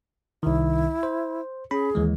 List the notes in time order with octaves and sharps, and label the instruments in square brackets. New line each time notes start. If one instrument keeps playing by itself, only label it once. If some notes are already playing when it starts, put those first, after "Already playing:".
[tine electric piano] C2 D#3 [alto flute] E4
[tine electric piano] C5
[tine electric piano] C#4 B5 [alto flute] G#4
[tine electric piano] D#2 E3 G#3